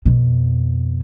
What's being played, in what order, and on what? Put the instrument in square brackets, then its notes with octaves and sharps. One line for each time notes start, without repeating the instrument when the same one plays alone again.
[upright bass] F2 B2